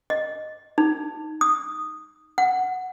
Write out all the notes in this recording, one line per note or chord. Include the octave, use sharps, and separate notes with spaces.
D#5
D#4
D#6
F#5